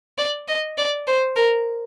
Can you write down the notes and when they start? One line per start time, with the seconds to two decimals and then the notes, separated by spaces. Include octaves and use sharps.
0.18 D5
0.48 D#5
0.78 D5
1.07 C5
1.36 A#4